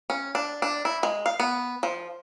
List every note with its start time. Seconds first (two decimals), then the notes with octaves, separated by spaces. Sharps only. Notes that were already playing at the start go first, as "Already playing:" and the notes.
0.10 C#4
0.35 D4
0.62 D4
0.85 E4
1.03 G#3
1.26 F5
1.40 B3
1.83 F3